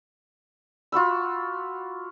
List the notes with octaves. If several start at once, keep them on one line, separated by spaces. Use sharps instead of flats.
F4 F#4 B5 E6